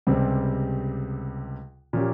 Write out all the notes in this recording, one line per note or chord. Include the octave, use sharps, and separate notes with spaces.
C#2 C3 G3 C4
A#2 F3 A#3 C#4 G4